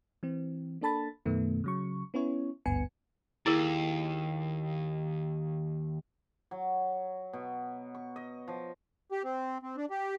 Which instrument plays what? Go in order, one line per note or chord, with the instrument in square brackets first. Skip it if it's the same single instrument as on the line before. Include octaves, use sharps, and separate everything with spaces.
[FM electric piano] E3 C4
A#3 D4 A4 A5 B5 A6
F#2 B2 D#3 A3 B3
C#3 F#3 C#6
B3 C#4 E4 C#5
G#1 D2 G2 B3 G#5 C#7
[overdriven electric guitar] D#2 [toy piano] E4 G#4 A#4
[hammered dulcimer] F#3
B2
C#6
D#5
F3
[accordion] G4
C4
C4
D4
G4